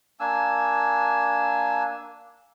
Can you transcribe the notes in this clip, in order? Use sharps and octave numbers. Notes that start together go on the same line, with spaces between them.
A#3 D4 G#5 E6